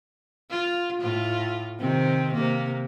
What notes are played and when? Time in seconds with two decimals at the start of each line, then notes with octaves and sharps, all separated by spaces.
0.50 F4
1.02 A2 F4
1.79 C3 D#3 C4
2.33 C3 A#3